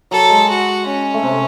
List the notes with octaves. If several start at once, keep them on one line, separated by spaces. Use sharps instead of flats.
F#3 A4
G#3
F#4
C#4
A3
C3 C4